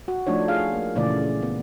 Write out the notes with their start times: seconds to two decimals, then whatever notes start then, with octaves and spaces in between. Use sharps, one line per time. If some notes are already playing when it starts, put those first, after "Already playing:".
0.08 F#4
0.27 F3 A3 D4 D#4 C#5
0.48 F4 G#4 F5
0.73 A#3
0.96 A#2 C#3 E3 A3 D5
1.43 B3